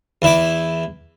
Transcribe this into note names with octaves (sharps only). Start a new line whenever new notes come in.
E2 E4 D6